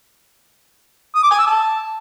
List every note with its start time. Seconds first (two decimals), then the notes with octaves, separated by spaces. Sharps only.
1.15 D#6
1.23 D6
1.31 G#5
1.39 E6
1.46 A5